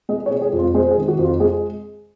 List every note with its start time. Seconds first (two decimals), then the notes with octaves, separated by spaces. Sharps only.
0.09 G#3 D#5
0.26 C#5
0.31 G#3
0.42 G#4
0.53 F2
0.59 F4
0.74 G#3 C5
0.91 G#4
0.97 D#3
1.08 F#4
1.18 F2
1.24 F4
1.40 G#3 G#4